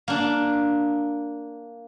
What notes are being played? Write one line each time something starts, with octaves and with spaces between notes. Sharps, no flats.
A#3 D4